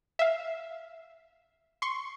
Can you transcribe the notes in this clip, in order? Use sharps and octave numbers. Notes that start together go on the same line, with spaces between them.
E5 F5
C6 C#6